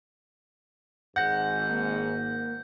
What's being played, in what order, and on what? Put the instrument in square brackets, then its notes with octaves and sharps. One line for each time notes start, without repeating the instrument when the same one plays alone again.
[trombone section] G#1 G#2 [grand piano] F#5 [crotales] G6 A#6
[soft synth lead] A#3